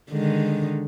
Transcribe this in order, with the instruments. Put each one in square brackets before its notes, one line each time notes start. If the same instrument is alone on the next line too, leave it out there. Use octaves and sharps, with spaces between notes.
[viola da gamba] D3 D#3 G#3